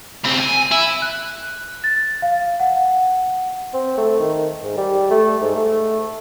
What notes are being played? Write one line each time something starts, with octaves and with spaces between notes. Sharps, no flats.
C#3 C4
G#5
E4
F#6
A6
F5
F#5
C4
A3
D#3
G#2
G3
A3
G#2
A3